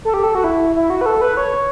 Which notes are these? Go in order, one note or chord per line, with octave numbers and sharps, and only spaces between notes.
A4
G4
A4
F#4
E4
E4
F#4
B4
A4
B4
C#5